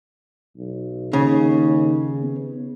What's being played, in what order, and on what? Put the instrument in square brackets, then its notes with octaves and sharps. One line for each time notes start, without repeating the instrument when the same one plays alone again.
[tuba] B1
[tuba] D#2 [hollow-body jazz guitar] C#3
[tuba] B3